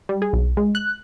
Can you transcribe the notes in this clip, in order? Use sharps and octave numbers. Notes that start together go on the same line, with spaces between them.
G3
G#4
B1
G#3
F#6